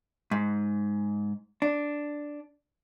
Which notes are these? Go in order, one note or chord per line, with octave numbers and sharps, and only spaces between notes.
G#2
D4